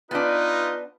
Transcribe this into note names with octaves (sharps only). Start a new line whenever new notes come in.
B3 D4 D#4 F4 B4